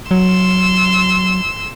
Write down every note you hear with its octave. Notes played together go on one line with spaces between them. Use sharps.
F#3 C6 E6